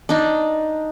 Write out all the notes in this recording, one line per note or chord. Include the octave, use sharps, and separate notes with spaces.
D4 D#4